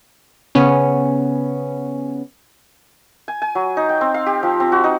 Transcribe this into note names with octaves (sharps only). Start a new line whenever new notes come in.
C#3 B3 C#4
G#5
G#5
F#3
D#4
G5
C4
F5
G4
F3
C4
F#4
D#4